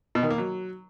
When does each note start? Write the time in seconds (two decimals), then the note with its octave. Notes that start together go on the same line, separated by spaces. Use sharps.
0.15 B2
0.23 D#3
0.30 A#3
0.38 F#3